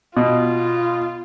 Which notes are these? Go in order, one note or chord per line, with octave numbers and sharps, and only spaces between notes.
B2 F4